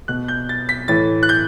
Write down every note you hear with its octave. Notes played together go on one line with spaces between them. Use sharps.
B2 F#6
G6
A6
B6
A2 E3 A6
F#6
G6